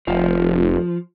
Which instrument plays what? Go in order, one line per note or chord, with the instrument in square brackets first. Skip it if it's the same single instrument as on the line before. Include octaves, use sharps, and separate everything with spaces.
[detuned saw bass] F1 [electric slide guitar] F3